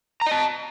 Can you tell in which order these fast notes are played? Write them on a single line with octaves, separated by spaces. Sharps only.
A#5 D#5 A5